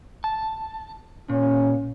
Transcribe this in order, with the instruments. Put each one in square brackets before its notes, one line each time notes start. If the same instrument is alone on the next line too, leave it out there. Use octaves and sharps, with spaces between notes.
[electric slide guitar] A5
[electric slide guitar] A#2 [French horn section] C#4